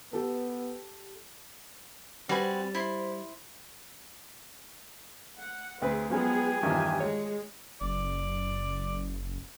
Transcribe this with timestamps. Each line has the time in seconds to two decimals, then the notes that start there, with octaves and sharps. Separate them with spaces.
0.13 B3 G4 A4
2.29 G3 C4 F#4 B4 G#5
2.75 E4 C5 C6
5.38 F#5
5.82 D2 C4 G#4 B4
6.10 F3 F#3 G#3 B3 G#4 G5 G#5
6.63 E2 G2 D#3 F3 D4 G4
7.00 G#3 C#5
7.81 F#1 D5